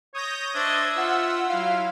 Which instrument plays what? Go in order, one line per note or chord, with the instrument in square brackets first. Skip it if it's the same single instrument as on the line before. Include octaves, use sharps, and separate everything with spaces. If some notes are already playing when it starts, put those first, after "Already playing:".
[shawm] C#5 [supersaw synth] D#6 G6 A#6
[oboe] D4 [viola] C5 D#5 [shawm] E5 [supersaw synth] G#6
[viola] F4 [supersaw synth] F#5 E6 [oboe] C6
[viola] F#3 E4 [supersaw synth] F5